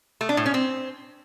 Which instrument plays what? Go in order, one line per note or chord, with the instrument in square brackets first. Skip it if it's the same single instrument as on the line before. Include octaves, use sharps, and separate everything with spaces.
[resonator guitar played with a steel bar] A3
D4
A2
C#4
C4